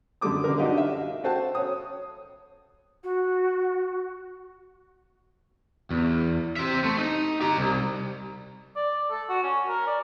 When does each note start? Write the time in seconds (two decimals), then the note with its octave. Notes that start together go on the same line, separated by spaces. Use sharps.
0.21 F#2 D3 G3 A4 D6 D#6
0.44 D3 A#4
0.58 D4 D#4 F#4 G4 D#5 F5
0.77 E5 F5
1.24 F#4 A4 C5 F#5 G5 A5
1.55 C#5 D#6
3.04 F#4
5.91 E2
6.56 C4 E5
6.84 A3
6.98 D#4
7.41 G4 A#5
7.57 C2
8.76 D5
9.10 A4
9.29 F#4
9.43 C#4
9.68 A#4
9.87 D5